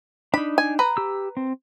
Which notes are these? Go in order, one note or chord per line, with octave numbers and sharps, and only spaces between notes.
D4 D#4 B5
G#5
B4 A#5
G4 E6
C4